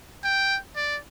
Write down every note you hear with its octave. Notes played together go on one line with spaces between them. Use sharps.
G5
D5